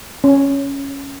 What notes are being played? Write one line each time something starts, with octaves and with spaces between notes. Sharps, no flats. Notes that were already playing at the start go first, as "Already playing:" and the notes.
C#4